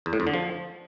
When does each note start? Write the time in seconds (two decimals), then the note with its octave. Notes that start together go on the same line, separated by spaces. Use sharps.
0.06 E2
0.13 A2
0.20 F2
0.27 D3
0.34 F3